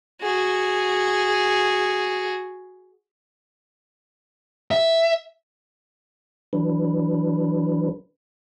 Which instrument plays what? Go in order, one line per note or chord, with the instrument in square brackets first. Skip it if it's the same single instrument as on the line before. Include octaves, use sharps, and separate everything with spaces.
[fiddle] F#4 G#4
[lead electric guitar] E5
[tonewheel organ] E3 F#3 D4 B4